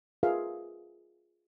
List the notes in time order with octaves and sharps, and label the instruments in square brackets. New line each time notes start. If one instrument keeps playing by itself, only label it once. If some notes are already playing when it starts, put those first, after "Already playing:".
[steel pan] F4 G#4 A#4 B4 E5 F5